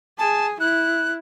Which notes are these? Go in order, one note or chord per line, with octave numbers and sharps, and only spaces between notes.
G#4 A5
E4 F#6